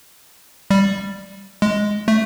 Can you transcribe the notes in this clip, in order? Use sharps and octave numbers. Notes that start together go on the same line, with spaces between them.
G3
G#3
A3